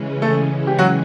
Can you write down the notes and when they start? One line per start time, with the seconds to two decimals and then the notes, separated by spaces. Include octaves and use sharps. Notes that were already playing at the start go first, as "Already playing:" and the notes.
Already playing: C#3 E3 G#3 C#4
0.22 A3 A4
0.67 G4
0.79 F#3 F#4